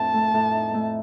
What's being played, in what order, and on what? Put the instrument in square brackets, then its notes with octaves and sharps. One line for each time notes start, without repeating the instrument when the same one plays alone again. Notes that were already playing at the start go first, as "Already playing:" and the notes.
Already playing: [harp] F2 A2 C4 D4 [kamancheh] A5
[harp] A3
A2
D#4
A3